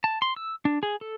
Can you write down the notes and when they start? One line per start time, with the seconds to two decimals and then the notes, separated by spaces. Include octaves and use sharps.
0.04 A5
0.22 C6
0.36 E6
0.65 D4
0.83 G#4
1.01 A4